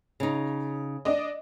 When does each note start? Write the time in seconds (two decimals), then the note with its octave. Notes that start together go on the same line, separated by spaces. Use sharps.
0.20 C#3 D#4
1.05 D4 D5 D#5